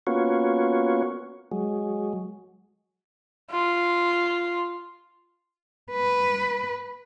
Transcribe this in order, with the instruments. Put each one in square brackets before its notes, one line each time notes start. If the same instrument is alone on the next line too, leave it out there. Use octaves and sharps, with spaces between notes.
[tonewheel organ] A#3 B3 C#4 F4 F#4 C#5
F#3 G#3
[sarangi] F4
[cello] B4